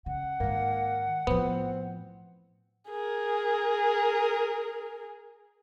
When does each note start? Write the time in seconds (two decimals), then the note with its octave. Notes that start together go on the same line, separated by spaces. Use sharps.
0.06 C#3 F#5
0.40 G#2 D#3 A#3
1.27 A2 F3 B3 C4
2.90 G#4 A#4